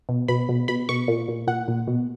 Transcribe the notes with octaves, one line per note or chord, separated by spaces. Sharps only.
B2
B2 B5
B2
B2 B5
B2 C#6
A#2
A#2
A#2 F#5
A#2
B2